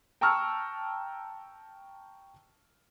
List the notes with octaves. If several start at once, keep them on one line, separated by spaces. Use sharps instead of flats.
G5 A5 A#5 C#6 E6 F6